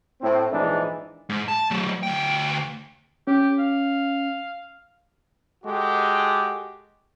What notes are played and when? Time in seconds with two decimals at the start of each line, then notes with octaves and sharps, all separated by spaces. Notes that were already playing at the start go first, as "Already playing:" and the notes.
0.21 A2 C4
0.52 A#1 G#2 E3 D4 D#4
1.29 G#2
1.48 A5
1.71 F#3 A3
2.03 D2 G5
3.27 C#4 G4
3.59 F5
5.64 G#3 F#4 G4 A4